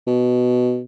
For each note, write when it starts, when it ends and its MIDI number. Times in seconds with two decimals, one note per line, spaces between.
0.07 0.82 47